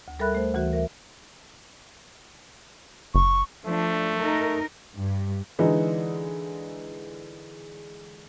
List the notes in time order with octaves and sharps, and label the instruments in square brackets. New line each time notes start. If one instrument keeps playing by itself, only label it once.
[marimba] D2
G3 A4 A#4 E5 B5 F#6
A3 C5
D2 E3 F#4 E5
A#4 E5
[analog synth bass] F#1 [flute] C#6
[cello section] F3 D4 [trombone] A3
[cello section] D#4 A#4
G2
[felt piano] D3 E3 G#3 D#4